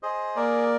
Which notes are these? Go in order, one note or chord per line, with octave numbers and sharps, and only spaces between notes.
G#4 C5 D#5
A#3 A#4 D5